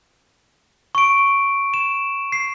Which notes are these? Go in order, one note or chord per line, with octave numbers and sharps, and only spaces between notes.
C#6 D7
E7
C7